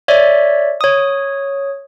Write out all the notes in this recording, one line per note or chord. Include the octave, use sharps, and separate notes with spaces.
C#5 D5 E5
C#5 D#6